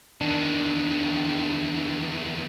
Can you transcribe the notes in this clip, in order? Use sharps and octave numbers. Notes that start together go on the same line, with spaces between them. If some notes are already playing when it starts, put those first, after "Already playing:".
E2 D#3 D4